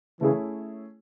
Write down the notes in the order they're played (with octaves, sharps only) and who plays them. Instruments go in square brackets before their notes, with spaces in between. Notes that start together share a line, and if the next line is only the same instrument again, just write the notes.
[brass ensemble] C#3 E3 [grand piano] A3 C#4 E4 G#4 C#5